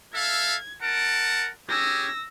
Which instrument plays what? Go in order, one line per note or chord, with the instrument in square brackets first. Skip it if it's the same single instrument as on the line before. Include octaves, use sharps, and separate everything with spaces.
[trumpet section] A4 E5 F5 [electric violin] G#6
[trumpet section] A#4 F#5 A5 [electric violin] D7
[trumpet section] C#4 G4 G#4 [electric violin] E6 A#6